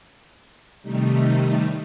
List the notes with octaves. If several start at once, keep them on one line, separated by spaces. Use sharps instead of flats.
C3 D#3 G3 A3 D#4